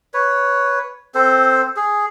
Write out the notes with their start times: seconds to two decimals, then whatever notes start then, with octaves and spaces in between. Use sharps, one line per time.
0.14 B4 C#5
1.15 C4 A4 C5
1.76 G#4